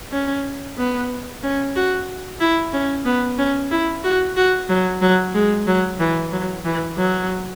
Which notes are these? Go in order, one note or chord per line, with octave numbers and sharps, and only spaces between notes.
C#4
B3
C#4
F#4
E4
C#4
B3
C#4
E4
F#4
F#4
F#3
F#3
G#3
F#3
E3
F#3
E3
F#3